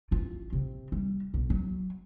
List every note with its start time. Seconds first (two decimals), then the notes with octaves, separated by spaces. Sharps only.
0.11 A1 F4
0.53 C3
0.92 G3
1.34 B1
1.50 F#3